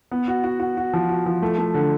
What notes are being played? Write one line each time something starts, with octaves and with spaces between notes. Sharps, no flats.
B3
F#4
F#4
F#4
F#4
F3
F#4
F3
A3
A3
D3